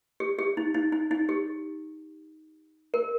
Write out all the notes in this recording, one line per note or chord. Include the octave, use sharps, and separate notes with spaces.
G4
G4
D#4
D#4
D#4
D#4
G4
A#4